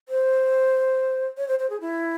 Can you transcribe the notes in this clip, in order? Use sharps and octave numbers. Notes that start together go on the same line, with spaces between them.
C5
C#5
C5
C5
G#4
E4